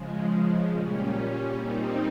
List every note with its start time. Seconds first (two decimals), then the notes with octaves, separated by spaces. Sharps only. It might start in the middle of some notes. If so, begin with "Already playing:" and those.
Already playing: C#3 F3 G#3
0.69 A#2 G3 C#4
1.56 A#2 G3 C4 D#4